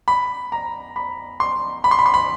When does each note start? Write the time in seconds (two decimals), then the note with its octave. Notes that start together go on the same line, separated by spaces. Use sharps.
0.08 B5
0.52 A#5
0.96 B5
1.40 C6
1.84 B5
1.91 C6
1.99 B5
2.06 C6
2.14 B5